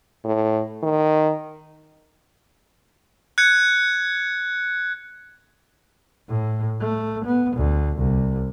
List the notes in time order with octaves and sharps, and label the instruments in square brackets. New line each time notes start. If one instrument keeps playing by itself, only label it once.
[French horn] A2
D#3
[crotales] F#6 G#6 C#7
[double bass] A2
A3
B3
D2
C2